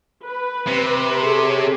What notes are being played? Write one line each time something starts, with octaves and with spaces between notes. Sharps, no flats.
B4
C3
G#4 A4 C#5